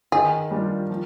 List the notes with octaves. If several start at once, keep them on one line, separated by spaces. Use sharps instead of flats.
D#3 G#4
G3 D4 F4
F3